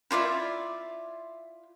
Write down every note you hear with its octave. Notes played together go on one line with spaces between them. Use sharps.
E4 F4 D5 E5